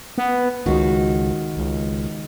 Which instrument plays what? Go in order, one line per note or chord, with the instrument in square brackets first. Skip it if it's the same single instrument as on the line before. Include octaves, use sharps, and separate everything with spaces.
[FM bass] B3
[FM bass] C#2 [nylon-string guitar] D#3 F#4
[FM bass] C#2